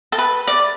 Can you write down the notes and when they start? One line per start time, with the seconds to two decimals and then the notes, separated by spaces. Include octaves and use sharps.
0.12 A4
0.18 B4
0.47 D5